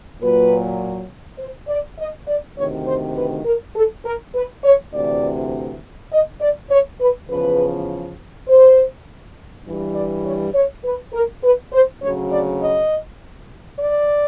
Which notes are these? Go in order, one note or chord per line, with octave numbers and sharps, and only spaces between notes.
A#2 F#3 B4
C5
D5
D#5
D5
D2 C3 D#3 C#5
C5
B4
A#4
A4
A#4
B4
C#5
D2 C3 E3 D5
D#5
D5
C#5
B4
E2 C#3 F3 B4
C5
G2 E3 G3
D5
C#5
C#5
B4
A#4
B4
C5
D2 C#3 F#3 C#5
D5
D#5
D5